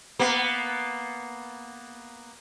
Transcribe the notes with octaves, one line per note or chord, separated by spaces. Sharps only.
A#3 B3